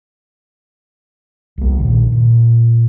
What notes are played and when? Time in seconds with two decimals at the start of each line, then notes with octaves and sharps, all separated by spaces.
1.58 C2 A#3
1.79 A#1 A#2 D#3
2.12 A#2